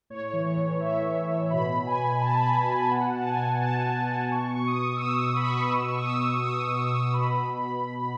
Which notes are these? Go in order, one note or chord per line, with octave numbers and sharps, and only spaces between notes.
A2 C#5
E3
C#5
A2
E3 E5
A2
E3
B2 B5
B2
G#5
B2
B2 A5
B5
B2
A5
B2
G#5
B2 F#5
B2 A5
G#5
B2
B2 A5
B2
A5
B2
B2 C#6
B2 C#6
D#6
B2
E6
B2 D#6
B2
B5
B2 C#6
D#6
B2 E6
C#6
B2 D#6
E6
B2
B2 D#6
B2
C#6
B2
B2 B5